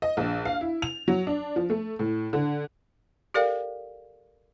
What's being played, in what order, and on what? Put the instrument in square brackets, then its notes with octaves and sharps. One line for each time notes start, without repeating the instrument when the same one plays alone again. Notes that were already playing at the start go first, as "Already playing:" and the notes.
[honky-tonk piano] D#5
A#1
F5
E4
F7
F#3
D4
F3
A3
A2
D3
[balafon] G4 A4 A#4 D5 F5 G5